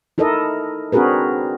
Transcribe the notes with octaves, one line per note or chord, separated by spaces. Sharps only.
D#4 E4 A4 A#4 D#5
C4 D4 F#4 G#4 A#4 B4